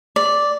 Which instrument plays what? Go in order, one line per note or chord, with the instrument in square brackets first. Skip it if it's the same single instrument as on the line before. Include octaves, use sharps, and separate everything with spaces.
[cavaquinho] D5